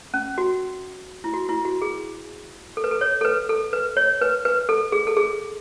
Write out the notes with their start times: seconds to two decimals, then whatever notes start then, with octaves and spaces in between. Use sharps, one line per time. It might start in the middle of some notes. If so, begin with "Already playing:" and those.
0.14 C#4
0.38 F#4
1.24 E4
1.34 F#4
1.49 E4
1.65 F#4
1.82 G#4
2.77 A4
2.84 B4
2.91 A4
3.01 C#5
3.21 A4
3.25 B4
3.49 A4
3.73 B4
3.97 C#5
4.21 B4
4.45 B4
4.69 A4
4.92 G#4
5.07 A4
5.17 G#4